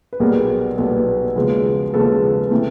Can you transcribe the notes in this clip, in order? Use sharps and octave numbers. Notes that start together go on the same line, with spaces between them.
B4
B1 A#2 G3 B3 G#4 A#4
B1 A#2 G3 B3 A4 B4
D#2 C#3 F3 G#3 B3
D#2 C#3 F3 G#3 B3 A4 B4
C3 E3 A3